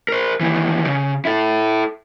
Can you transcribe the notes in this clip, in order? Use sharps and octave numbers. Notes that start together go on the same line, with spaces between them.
A#4 C5
D#2 E3
C#3
E4 A4